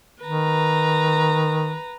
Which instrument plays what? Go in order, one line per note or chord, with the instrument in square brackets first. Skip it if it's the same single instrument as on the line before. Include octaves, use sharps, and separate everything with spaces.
[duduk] D#3 [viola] B4 A#5